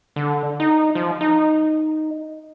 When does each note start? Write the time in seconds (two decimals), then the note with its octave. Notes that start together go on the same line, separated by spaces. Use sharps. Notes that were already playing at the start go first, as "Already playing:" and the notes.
0.16 D3
0.60 D#4
0.95 F3
1.21 D#4